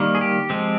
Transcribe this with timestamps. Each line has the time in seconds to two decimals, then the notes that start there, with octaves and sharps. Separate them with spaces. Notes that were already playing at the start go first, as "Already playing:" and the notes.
Already playing: D#3 G3 A#3
0.15 G#4
0.21 G4
0.50 F3 G#3 C4